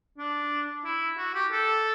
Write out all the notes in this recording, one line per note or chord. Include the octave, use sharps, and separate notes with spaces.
D4
E4
F#4
G4
A4